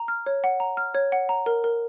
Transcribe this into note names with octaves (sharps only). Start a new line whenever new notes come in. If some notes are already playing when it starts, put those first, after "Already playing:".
Already playing: A#5
F6
C#5
F#5
A#5
F6
C#5
F#5
A#5
A#4
A#4